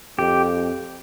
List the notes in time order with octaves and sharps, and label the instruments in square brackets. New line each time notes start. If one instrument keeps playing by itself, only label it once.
[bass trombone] F2 [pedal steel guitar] G4